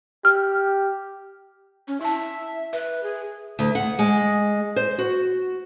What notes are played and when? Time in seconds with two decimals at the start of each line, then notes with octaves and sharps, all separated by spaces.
0.25 G4 F6
1.88 C#4
2.01 E4 E5 A5
2.73 B4 E5
3.03 G#4
3.59 D2
3.75 F#5
3.99 G#3
4.76 C5
4.98 F#4